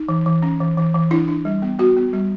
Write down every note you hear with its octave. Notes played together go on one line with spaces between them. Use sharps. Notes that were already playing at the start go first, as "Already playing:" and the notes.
Already playing: D#4
E3
E3
C#4
E3
E3
E3
D4 E4
D4
G3
B3
B3 F#4
B3
G3